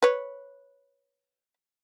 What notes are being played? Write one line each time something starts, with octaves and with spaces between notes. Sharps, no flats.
B4 C#5